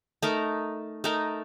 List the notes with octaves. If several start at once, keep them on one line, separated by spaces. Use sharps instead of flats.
A3 D#4 A#4
A3 D#4 A#4